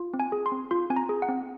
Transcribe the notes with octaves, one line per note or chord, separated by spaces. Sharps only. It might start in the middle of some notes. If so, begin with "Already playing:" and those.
Already playing: F4
C4
G#5
G#4
C6
C4
F4 C6
C4 G#5
A#5
G#4
F#5
C4